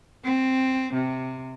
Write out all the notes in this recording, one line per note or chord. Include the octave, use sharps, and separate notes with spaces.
C4
C3